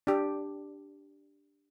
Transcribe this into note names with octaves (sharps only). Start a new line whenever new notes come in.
D4 G4